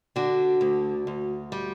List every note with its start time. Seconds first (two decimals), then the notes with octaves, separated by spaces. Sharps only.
0.16 D3 D4 F#4
0.61 D2
1.07 D2
1.52 G3